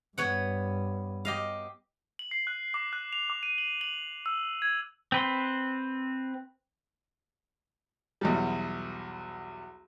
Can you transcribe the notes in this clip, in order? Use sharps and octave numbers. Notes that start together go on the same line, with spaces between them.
G2 B3 C#5 F#5
G4 D#5 F5
F#7
C7
F#6
D6
F#6
F7
D6
D#7
F#7
F#7
E6
G#6
C4 B4 C6
B1 E2 G3